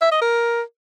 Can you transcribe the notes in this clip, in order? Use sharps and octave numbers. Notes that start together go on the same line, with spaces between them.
E5
D#5
A#4